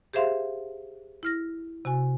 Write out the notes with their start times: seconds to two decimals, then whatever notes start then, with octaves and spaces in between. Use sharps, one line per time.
0.13 G4 G#4 C5 E5 F5 C6
1.23 E4 F6 A#6
1.85 C3 F#4 G#5